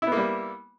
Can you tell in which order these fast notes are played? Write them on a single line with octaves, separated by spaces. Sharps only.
E4 B3 A#3 G3